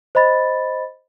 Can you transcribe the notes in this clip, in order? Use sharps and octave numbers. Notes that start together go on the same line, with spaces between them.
C5 D#5 B5 A6